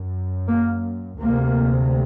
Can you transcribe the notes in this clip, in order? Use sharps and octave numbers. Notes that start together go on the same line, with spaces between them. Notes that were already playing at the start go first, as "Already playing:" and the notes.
Already playing: F#2
A#3
D2 C3 A#3